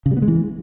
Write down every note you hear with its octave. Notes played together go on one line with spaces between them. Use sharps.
C#3
G3
B3
G#3
E3